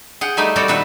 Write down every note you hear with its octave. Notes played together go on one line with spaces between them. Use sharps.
G#4 F#5 G5
G3 A3 D#4 E5 G#5
G3 C4 F#4 A4 A#4 D5
A#2 D#3 B4 E5 F#5